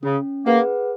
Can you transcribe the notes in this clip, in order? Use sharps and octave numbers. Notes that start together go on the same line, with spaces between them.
C#3 C#4
A#3 G#4 B4 F#5